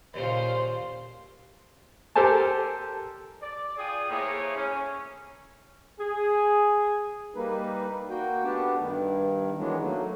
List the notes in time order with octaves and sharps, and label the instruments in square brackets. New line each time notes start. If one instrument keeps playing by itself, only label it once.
[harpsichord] D#2 A#2 C#3 [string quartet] F4 C5
[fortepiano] G4 A4 A#4 C5 G#5 A5
[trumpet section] D5
F4 G#4 G5 D#6
A3 A#3 E4 G#4 C5 C#5
C#4
[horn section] G#4
[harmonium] G3 A#3 D#4 B4
A#3 F#4 G5
A3 B3 D4 G4 A5
G2 D#3
D#3 E3 F#3 G#3 B3 D4
F#3 A3 A#3